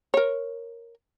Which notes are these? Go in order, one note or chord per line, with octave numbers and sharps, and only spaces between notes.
A#4 C#5